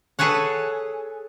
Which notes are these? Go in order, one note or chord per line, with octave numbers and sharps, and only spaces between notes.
G#4 A4 B4 C#5 F#5